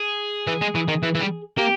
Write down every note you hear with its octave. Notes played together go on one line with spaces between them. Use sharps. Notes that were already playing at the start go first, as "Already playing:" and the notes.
Already playing: G#4
E3
G#3
E3
D#3
E3
E3
G3
A#3 G4